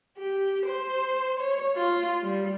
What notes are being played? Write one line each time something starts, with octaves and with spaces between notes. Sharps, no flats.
G4
C5
C#5
F4
G3